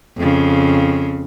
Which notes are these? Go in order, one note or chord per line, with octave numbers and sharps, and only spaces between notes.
F2 C#3